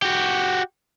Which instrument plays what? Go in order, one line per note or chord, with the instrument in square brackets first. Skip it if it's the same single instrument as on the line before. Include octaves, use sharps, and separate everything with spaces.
[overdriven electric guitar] F#4 G4